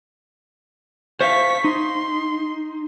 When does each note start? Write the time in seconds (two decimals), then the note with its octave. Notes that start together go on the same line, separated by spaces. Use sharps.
1.21 C5 E5 F5 C#6 B6
1.64 D#4 C6